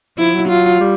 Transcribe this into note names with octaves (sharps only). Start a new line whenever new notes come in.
F3 E4
F#3
F4
G3